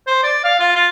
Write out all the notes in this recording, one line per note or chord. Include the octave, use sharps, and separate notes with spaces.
C5
D5
F5
F4
F4